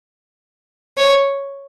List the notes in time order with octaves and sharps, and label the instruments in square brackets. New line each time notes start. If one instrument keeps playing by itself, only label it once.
[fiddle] C#5